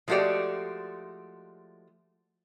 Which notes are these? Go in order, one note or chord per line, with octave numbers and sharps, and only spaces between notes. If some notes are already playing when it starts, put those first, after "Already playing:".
F3 G#3 A3 F#4 G4 D5